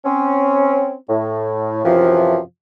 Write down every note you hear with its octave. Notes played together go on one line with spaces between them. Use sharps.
C4 C#4
A2
F#2 C3 E3 F3